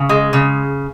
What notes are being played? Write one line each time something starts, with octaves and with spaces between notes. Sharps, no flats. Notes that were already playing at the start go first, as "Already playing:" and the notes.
Already playing: C#3
G#3
C#3